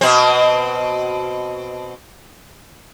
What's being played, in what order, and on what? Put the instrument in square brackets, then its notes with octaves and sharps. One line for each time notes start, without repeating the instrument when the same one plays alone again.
[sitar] B2 C4